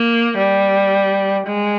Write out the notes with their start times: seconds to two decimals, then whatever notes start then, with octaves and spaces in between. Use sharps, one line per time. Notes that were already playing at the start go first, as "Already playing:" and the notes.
Already playing: A#3
0.37 G3
1.47 G#3